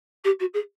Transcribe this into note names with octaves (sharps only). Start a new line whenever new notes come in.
G4
F#4
G#4